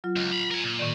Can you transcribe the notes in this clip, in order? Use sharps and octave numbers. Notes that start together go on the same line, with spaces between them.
F#3 F4
C#2
A#5 B5
A#4 G#5
A#2
A2 D#3 D5